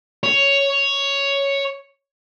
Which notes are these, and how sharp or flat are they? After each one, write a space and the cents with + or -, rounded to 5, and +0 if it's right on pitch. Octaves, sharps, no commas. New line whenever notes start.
C#5 +5